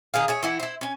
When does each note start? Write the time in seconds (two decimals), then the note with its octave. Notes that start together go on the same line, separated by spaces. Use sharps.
0.14 D3 D#3 G#4 F5
0.28 G#4 C#5 E5
0.43 E3 E4 F#4
0.60 E4 C5
0.81 C#4 G#5